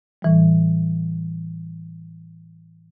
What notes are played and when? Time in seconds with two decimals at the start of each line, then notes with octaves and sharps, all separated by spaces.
0.22 A2 E3 G3